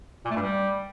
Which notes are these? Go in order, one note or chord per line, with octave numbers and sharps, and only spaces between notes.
A#2
A3
G2
G3